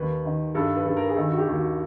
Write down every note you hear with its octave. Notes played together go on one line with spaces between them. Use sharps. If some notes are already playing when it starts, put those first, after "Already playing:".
Already playing: D#2 B4
D#3
G2 A4
B4
G2 A4
A#4
G#4
D#3 A4
F#4
G4
D#2
F#4